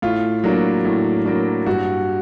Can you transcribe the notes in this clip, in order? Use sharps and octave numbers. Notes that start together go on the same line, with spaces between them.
A2 F4
F#3 A#3 D4
A2
F#3 A#3 D4
G2 F#4